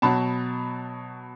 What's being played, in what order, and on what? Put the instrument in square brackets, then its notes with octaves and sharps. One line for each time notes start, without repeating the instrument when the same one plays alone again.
[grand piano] B2 F#3 A5 B5